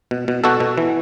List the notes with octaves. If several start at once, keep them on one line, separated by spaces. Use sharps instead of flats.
B2
B2
B2 F#4 A4
B2
E3